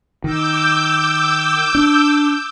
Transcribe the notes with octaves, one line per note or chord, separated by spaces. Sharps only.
D#3 D6 E6 G6
D4